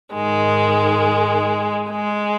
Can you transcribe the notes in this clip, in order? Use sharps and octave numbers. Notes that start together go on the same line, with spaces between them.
G#2 D#3 G#3
G#3